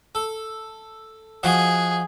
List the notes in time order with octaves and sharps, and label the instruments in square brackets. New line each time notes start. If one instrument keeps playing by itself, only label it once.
[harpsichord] A4
[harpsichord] F3 F#4 D#5 [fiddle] G#4